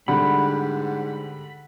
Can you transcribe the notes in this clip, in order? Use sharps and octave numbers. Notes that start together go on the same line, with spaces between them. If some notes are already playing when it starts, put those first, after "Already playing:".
G#2 D3 G3 F#5 B5